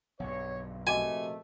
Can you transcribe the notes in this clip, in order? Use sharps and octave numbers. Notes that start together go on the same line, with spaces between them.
B1 G2 C#5
A#1 C3 A3 F#4 D#5 G#5 D6